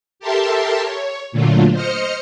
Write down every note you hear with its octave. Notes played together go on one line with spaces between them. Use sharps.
G4 A4 A#4 E5 A5 C6
C#5
A#2 D3 F#3 A3 F4
C5 D#5 F6 C#7